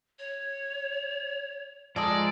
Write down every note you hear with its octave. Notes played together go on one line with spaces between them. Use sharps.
C#5
F3 G#3 D#4 A4 D5 D#6